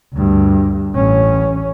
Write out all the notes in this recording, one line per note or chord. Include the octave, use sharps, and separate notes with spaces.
D2 G2
A1 C#4